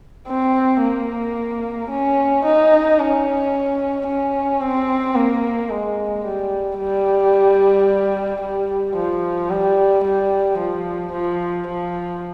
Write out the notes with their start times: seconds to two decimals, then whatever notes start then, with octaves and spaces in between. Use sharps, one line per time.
0.27 C4
0.81 A#3
1.90 C#4
2.45 D#4
2.99 C#4
4.07 C#4
4.61 C4
5.15 A#3
5.70 G#3
6.24 G3
6.78 G3
8.41 G3
8.96 F3
9.50 G3
10.04 G3
10.58 F3
11.12 F3
11.67 F3